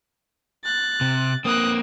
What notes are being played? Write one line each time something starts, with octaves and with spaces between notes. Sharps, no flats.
F#6 A6
C3
A#3 C4 D#6 F#6